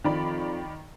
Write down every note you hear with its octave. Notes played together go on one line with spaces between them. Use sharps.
F2 D#3 D5 B5